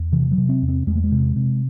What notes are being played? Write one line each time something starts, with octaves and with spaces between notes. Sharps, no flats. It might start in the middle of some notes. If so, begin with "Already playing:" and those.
Already playing: E2
C3 E3
F#3
C3
C4
E2
C4
E2 G#3
A3
G#3
C3
C3